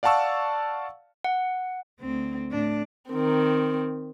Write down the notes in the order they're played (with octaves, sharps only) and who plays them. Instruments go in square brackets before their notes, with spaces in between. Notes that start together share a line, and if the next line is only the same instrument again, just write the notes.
[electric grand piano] D5 F5 F#5 A5 C#6 E6
[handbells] F#5
[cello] D2 C4
A2 D4
[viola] D#3 C4